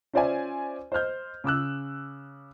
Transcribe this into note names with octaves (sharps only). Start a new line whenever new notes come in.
C#4 F4 C5 D5 E5 G#5
C5 D#5 F6 G6
C#3 D6 E6 F#6